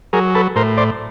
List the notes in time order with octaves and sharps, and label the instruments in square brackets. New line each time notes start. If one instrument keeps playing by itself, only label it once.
[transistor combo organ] F#3 G#4 A#4
A4 B4
A2 A#4 C5
C5 D5